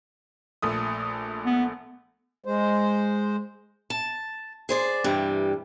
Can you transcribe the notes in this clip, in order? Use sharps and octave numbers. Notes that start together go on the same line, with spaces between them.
A#1 A3 D#6
B3
G#3 C5
A5
G#4 C5 D5
G2 C3 E3 G3